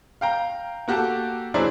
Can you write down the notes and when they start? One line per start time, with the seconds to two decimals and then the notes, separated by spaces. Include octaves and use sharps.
0.21 F5 G5 A#5
0.88 A#3 F#4 G4 A4 A5
1.54 F#3 D4 E4 G#4 C5 D5